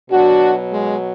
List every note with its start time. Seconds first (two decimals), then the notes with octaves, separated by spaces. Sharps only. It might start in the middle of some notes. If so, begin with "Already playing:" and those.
0.10 B2 F#3 D4 F#4
0.72 G#3